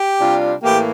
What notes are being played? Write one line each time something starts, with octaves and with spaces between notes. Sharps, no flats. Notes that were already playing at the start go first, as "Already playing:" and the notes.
Already playing: G4
C3 G3 D4 F4
A2 E3 A#3 G4